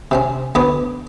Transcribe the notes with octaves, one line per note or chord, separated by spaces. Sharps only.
C3 C4 C#4
D2 B3 C#5 D6 D#6